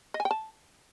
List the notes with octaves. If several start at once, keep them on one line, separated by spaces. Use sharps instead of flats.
D#5
G#5
G5
A5